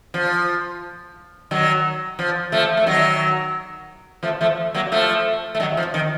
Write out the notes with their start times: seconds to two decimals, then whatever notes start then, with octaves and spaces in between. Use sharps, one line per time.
0.14 F3
1.51 D#3 F#3
2.19 F3
2.52 F3 A3
2.77 A3
2.86 D#3 F#3
4.23 F3 A3
4.41 F3 A3
4.74 F#3 A#3
4.92 F3 A3
5.55 A3
5.60 D#3 F#3
5.77 F3
5.94 D#3